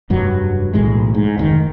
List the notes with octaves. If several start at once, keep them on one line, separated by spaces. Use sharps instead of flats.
F1 G2 F#3
B1 A2 E3 G#3
G#2
F1 C3 D#3